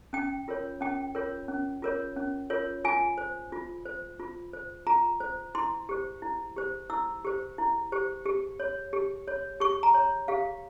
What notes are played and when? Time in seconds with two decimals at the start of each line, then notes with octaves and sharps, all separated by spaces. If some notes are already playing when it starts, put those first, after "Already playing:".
0.13 C#4 G5
0.48 F4 A#4 C#5
0.81 C#4 G5
1.15 F4 A#4 C#5
1.48 C#4
1.82 F4 A#4 C#5
2.16 C#4
2.50 F4 A#4 C#5
2.85 F4 G#5
3.18 C5
3.52 F4
3.85 C5
4.20 F4
4.53 C5
4.87 F4 A#5
5.20 C5
5.55 E4 C6
5.89 G4 C5
6.22 E4
6.56 G4 C5
6.90 E4 E6
7.25 G4 C5
7.58 E4
7.92 G4 C5
8.26 G4
8.60 C#5
8.93 G4
9.28 C#5
9.60 G4 C#6
9.83 A#5
9.94 C#5
10.28 G4 F5